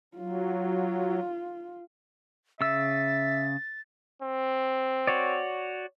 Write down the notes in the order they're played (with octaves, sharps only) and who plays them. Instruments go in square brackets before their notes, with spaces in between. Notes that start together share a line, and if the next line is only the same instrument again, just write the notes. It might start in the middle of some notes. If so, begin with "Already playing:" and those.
[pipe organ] F#3 [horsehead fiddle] F4
[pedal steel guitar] C#3 E6 [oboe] E5 [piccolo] A6
[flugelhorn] C4
[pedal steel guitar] F#4 C#5 D5